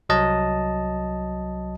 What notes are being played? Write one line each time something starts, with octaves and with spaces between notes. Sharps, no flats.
C2 F#3 D#5 A5